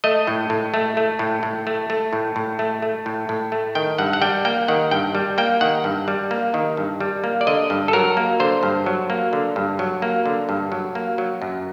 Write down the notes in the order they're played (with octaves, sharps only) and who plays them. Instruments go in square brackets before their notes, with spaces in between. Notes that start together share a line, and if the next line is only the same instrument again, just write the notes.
[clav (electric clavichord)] A3 D#5
A2
A2
A3
A3
A2
A2
A3
A3
A2
A2
A3
A3
A2
A2
A3
D#3 G5
G2 F#5
F#5
G3 G5
A#3 G5
D#3 F#5
G2 G5
G3
A#3 G5
D#3 F#5
G2
G3
A#3
D#3
G2
G3
A#3
D5
D3 D#5
G2
A4
F#3 A#4
A#3
D3 C5
G2
F#3
A#3
D3
G2
F#3
A#3
D3
G2
F#3
A#3
F#3
F#2